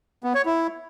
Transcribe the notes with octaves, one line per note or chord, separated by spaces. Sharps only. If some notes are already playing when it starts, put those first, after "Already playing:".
B3
C#5
E4